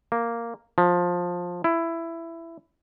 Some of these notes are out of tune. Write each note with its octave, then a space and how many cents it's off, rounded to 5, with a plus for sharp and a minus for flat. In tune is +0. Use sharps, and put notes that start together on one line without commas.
A#3 -5
F3 +15
E4 +15